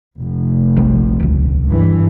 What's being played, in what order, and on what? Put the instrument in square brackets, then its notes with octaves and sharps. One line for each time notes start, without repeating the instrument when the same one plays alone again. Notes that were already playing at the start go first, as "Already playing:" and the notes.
[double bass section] F1
[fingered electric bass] A#1 G3 C4
D#1 C#2
[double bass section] G2 E3